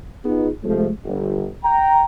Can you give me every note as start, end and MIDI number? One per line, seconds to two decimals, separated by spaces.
0.25 0.48 59
0.25 0.48 63
0.25 0.48 65
0.25 0.48 68
0.64 0.89 48
0.64 0.89 53
0.64 0.89 56
0.64 0.89 57
1.05 1.47 31
1.64 2.04 79
1.64 2.04 82